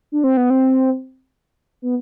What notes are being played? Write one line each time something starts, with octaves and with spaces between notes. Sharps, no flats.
D4
C4
B3
C4
B3